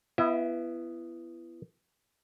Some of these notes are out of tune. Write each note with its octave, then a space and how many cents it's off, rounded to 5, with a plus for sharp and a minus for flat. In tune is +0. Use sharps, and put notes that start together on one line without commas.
B3 +5 E4 +30 E5 -40